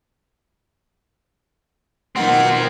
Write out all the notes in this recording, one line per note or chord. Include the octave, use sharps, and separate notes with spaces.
B2 D#3 F3 C4 F4 F#5